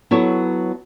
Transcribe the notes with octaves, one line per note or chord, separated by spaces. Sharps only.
F#3 B3 E4 A4 C#5